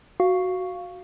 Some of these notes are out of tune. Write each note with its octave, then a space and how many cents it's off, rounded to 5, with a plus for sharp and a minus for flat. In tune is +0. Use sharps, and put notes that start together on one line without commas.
F#4 +0 F5 +0